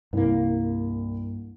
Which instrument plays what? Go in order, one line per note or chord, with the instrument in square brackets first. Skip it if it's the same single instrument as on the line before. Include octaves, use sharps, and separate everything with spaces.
[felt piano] C2 [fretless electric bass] G2 A#3